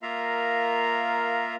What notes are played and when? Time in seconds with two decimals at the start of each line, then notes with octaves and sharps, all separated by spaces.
0.02 A#3 F4 A#4 E5 F5 A#5